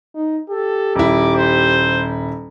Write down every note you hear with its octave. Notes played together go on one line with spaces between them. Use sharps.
D#4
G4 A4
D#1 E4 D6
C5